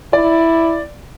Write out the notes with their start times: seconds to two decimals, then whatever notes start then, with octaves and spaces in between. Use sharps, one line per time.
0.13 E4 D5